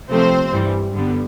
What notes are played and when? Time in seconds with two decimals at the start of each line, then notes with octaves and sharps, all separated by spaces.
0.10 C3 F3 A3 C4 C5
0.53 G2 E3 G3
0.94 G2 D3 G3 B3